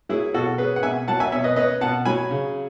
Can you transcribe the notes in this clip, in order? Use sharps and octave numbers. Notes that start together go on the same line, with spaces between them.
F#3 E4 G#4
B2 F#4 A4
C#4 G#4 B4
F#5
B2 E5 G#5
F#3 F#5 A5
E5 G#5
B2 C#5 E5
B4 D#5
C#4 B4 D#5
B2 F#5 A5
F#3 G#5 B5
C#3